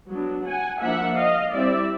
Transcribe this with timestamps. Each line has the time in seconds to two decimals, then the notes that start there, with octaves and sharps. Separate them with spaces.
0.10 F#3 B3 D4
0.45 F#5 G#5
0.81 F3 A#3 D4 E5 F#5
1.17 D#5 F5
1.53 G3 C4 E4 D5 E5